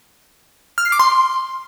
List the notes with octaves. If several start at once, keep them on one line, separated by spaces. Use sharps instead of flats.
F6
C7
D6
C6